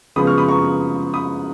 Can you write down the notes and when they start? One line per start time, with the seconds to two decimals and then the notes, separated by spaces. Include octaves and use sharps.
0.16 C#3 F3 G#3 B3 B5 D#6
0.27 C#6 F6
0.38 B5 D#6
0.48 A#5 C#6
1.14 B5 D#6